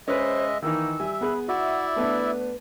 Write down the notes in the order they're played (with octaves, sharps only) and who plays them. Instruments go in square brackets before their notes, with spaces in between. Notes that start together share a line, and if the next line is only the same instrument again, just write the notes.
[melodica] G#3 D#5 E5 [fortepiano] C#4 B4 [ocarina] C5
[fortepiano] D#3 E3 D#4 [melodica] A#3 [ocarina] E6
[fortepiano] G3 G#5 [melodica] E5
[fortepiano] B3 G#4 F#6 [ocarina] B5
[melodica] E4 D5 E5 [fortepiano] F#4 [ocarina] F#5
[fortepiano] A3 B3 D4 [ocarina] B4